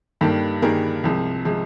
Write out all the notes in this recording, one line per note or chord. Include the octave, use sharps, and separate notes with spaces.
G2 D#3 G3 A#3 G4 A4
G2 D#3 G3 A#3 G#4 A#4
C2 C3 F3 G#3
C3 F3 G#3